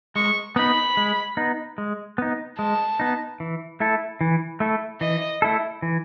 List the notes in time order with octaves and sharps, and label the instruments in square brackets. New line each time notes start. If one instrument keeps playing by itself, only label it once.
[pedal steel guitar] G#3 [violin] C#6
[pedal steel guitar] B3 D#4 [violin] B5
[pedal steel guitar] G#3
B3 D#4
G#3
B3 D#4
[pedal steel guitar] G#3 [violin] A5
[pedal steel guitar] B3 D#4
E3
A3 E4 A4
E3
A3 E4 A4
[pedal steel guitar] E3 [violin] D#5
[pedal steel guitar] A3 E4 A4
E3